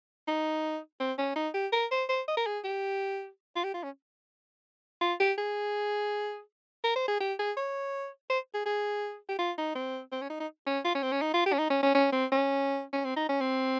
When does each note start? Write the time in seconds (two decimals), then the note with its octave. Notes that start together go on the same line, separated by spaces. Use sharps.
0.28 D#4
1.00 C4
1.18 C#4
1.36 D#4
1.54 G4
1.73 A#4
1.92 C5
2.09 C5
2.28 D#5
2.37 A#4
2.47 G#4
2.64 G4
3.56 F4
3.64 G4
3.74 F4
3.83 C#4
5.01 F4
5.20 G4
5.38 G#4
6.84 A#4
6.96 C5
7.08 G#4
7.21 G4
7.39 G#4
7.57 C#5
8.30 C5
8.54 G#4
8.66 G#4
9.29 G4
9.39 F4
9.58 D#4
9.75 C4
10.12 C4
10.22 C#4
10.30 D#4
10.40 D#4
10.66 C#4
10.85 F4
10.95 C#4
11.03 C4
11.12 C#4
11.22 D#4
11.34 F4
11.46 G4
11.53 C#4
11.59 D#4
11.70 C#4
11.83 C#4
11.95 C#4
12.12 C4
12.32 C#4
12.93 C#4
13.05 C4
13.17 D#4
13.29 C#4
13.41 C4